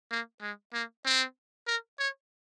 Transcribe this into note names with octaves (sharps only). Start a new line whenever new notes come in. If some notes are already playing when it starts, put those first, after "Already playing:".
A#3
G#3
A#3
C4
A#4
C#5